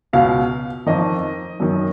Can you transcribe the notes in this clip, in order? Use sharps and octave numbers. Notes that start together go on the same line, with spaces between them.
C#2 B2 F5
F2 D#3 D#5
F#2 D#3